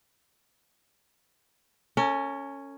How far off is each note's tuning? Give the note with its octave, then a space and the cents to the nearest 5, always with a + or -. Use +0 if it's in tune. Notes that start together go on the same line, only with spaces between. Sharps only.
C#4 +0 A4 +45